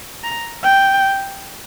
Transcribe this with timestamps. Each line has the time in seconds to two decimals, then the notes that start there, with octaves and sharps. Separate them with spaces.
0.24 A#5
0.64 G5